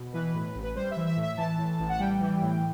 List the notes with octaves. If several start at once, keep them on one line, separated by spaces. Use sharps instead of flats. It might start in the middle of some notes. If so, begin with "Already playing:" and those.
Already playing: B2
E3 B4
A2
A1
B4
G3 C5
E5
E3
E5
A2
E5
E3 A5
A2
A1
F#5
G3 G5
E3
A2